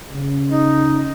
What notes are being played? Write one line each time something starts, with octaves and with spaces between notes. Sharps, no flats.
C#3
D#4